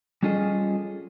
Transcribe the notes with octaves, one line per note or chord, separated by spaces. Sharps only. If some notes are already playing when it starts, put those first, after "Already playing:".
G3 C#4 F4 G#4 A4 D#5